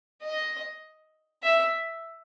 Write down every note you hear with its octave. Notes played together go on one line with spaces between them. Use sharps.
D#5
E5